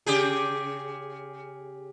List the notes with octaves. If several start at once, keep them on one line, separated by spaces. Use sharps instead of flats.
C#3 G4 G#4